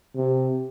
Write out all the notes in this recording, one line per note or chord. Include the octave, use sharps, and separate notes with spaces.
C3